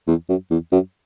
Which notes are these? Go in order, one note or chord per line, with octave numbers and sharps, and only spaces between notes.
E2
F#2
E2
F#2